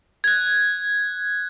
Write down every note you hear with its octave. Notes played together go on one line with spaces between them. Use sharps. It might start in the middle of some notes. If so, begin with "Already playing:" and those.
F#6 G#6